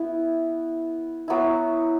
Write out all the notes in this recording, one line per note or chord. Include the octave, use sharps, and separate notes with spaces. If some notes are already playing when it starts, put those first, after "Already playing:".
Already playing: B3 E4
F#3 B3 E4